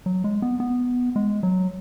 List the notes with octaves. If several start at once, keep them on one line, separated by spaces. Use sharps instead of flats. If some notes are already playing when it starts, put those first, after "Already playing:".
F#3
G#3
B3
B3
G#3
F#3